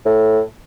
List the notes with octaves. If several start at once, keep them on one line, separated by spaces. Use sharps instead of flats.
A2